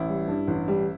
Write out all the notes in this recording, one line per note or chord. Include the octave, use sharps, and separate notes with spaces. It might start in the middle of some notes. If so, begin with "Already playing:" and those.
Already playing: A1 E4
G3
G2
A1
G3